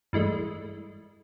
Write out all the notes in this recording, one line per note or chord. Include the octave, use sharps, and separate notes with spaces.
G2 E3 G#3 A3